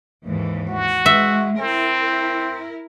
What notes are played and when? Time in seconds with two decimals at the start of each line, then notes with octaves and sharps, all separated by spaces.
0.25 D#2 G#2 E3
0.68 F#4
1.06 G#3 E5
1.59 C4 E4 A#4